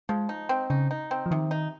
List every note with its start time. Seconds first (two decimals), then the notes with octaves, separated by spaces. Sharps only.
0.09 F3 G#3
0.29 D#4
0.49 C4
0.70 C#3 D#4
0.91 D#4
1.11 C4
1.26 F3
1.31 C3 D#3
1.51 D#4